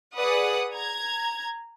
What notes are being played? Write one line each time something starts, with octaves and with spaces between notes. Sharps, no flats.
G#4 B4 D5 F#5 D#6
A#5 G#6